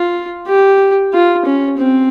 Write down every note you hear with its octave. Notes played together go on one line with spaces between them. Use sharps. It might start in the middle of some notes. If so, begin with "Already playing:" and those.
Already playing: F4
G4
F4
C#4
C4